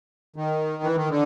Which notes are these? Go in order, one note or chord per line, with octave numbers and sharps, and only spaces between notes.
D#3
E3
D#3
D3